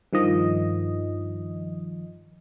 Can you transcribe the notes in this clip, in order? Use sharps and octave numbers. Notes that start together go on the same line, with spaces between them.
G2 D#3 F3 D#5